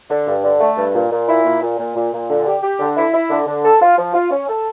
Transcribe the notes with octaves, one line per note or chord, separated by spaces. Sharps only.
D3
G2
D3
A3
G2
A#2
A#2
E4
A#2
A#2
A#2
A#2
A#2
D3
G4
G4
D3
E4
E4
D3
D3
A4
F4
F3
F4
C#4
A4